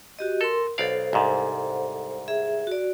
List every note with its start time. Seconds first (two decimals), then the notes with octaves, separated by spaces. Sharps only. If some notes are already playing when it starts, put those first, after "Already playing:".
0.19 F#4 G4 D#5
0.41 A4 A#4 C6
0.78 B1 A4 C5 D5 F5
1.13 C2 G#2
2.28 G#4 E5
2.67 F#4 D5